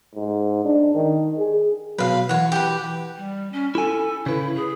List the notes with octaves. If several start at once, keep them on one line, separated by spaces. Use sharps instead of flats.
G#2
D4
D#3
G#4
B2 F#3 B4 F5
E3 C#5 F#5
G4 B4
G3
C#4
E4 A4 G#5
C#3 E4 B4
G#4